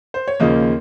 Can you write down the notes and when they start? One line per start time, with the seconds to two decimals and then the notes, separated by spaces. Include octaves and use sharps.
0.14 C5
0.28 C#5
0.40 D#2 C#3 F3 A#3 D#5